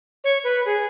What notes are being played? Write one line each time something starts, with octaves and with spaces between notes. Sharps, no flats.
C#5
B4
G#4